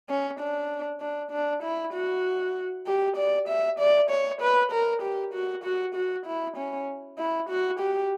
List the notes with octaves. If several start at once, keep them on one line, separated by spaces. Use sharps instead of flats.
C#4
D4
D4
D4
E4
F#4
G4
D5
E5
D5
C#5
B4
A#4
G4
F#4
F#4
F#4
E4
C#4
E4
F#4
G4